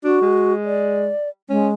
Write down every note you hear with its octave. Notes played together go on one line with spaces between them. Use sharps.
D4 F#4
G#3
D5
G#3 C#4